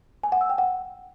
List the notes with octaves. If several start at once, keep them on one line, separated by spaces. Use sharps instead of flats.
G#5
F#5
E6
G5
F#5